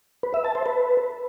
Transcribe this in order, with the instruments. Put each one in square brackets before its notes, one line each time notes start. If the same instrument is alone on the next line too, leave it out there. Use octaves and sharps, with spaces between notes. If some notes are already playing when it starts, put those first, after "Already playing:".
[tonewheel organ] B4
E5
A5
C5
B4